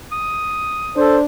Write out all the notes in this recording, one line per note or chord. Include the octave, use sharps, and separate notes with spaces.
D#6
D4 A4 C5